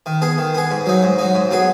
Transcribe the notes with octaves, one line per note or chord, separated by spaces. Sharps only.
D#3
B3 G#4
D#3
B3 G#4
G#2
F#3 D#4
G#2
F#3 D#4
G#2
F#3 B3 G#4